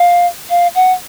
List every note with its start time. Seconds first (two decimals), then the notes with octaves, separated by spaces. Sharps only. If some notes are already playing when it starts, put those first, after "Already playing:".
Already playing: F5
0.50 F5
0.75 F#5